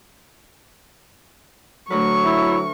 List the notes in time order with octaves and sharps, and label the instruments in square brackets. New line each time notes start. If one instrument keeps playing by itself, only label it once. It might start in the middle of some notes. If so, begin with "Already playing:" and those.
[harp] D2 B4 [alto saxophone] F#3 [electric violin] C#6
[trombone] E4